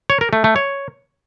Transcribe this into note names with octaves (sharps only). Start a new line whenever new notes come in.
C#5
A#4
A3
A3
C#5